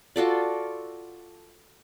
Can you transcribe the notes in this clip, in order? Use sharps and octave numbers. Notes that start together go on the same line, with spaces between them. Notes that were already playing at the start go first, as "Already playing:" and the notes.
F4 F#4 A4 D5